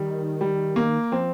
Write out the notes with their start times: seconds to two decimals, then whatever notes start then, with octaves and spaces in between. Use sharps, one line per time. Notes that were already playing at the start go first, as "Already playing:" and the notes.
Already playing: D#3 G3
0.41 G3
0.76 A#3
1.12 F3 C4